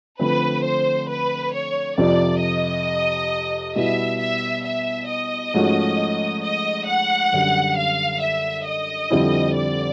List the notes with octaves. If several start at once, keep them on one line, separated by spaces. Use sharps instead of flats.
D3 F3 A3 C4 B4
C5
B4
C#5
F2 C3 F3 D5
D#5
B2 G3 B3 E4 E5
E5
E5
D#5
G#2 F3 A3 C#4 F#4
D#5
F#5
F#2 D3 G3
F5
E5
D#5
F2 D3 G3 C4 E4
D5